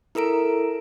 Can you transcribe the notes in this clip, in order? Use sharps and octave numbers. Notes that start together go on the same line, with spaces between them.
E4 A4 A#4 A#5 D7